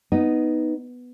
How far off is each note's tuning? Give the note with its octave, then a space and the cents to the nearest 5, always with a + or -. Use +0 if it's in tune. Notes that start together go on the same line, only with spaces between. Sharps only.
B3 +0 D#4 +0